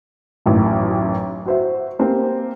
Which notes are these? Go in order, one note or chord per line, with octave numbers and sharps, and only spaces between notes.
A1 F#2 A2 D#3
F#4 C5 E5
A#3 C4 G4